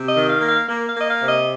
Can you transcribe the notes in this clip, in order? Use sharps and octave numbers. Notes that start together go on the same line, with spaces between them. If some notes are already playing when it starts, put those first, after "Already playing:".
Already playing: C3
D#5
D#3
F5
A#3
F5
A#3
F5
A#3
D#5
F5
C3
D#5